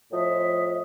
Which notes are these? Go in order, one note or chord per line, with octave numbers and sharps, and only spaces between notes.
A2 F3 D#5 E5